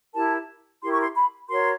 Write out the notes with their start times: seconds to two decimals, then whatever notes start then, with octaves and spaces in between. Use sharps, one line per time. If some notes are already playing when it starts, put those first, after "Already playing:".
0.13 E4 G4 A#4 A5
0.80 E4 G4 A#4 C6
0.91 C#6
1.02 C6
1.15 B5
1.48 F#4 A#4 C#5 C6